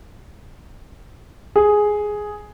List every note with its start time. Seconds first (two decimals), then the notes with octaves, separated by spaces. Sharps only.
1.56 G#4